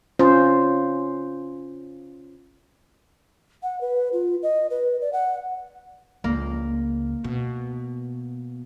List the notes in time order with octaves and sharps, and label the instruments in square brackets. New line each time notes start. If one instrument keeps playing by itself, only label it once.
[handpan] C#4 F4 C5
[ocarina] F#5
B4
F4
D#5
B4
D5
F#5
[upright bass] C#2 [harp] A#3
[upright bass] B2